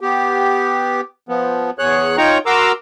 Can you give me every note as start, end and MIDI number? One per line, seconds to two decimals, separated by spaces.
0.01 1.01 59
0.01 1.01 67
1.29 1.70 53
1.29 1.70 59
1.79 2.17 40
1.79 2.17 68
1.79 2.17 73
1.79 2.17 90
2.17 2.38 63
2.17 2.38 65
2.17 2.38 73
2.17 2.38 79
2.17 2.38 82
2.17 2.38 85
2.46 2.72 66
2.46 2.72 70
2.46 2.72 82
2.46 2.72 84
2.46 2.72 86
2.46 2.72 88